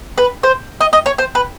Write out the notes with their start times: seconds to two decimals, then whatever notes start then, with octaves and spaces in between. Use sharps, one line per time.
0.18 B4
0.43 C5
0.81 D#5
0.93 D#5
1.06 C#5
1.18 C5
1.35 B4